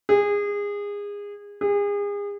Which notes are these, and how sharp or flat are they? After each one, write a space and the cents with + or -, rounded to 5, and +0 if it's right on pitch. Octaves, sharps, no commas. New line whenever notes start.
G#4 -25
G#4 -35